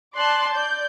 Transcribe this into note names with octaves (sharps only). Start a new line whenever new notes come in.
D5 A5 C6 F#6
D5 G6